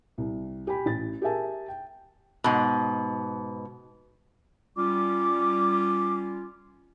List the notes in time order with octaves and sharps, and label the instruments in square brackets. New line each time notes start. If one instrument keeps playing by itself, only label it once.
[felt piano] C2
G4 G5 G#5 B5
A1 A6
G4 G#4 A#4 E5 G#5 A5
G5
[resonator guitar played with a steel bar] G#2 B2
[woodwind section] G3 C#4 F4 [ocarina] D6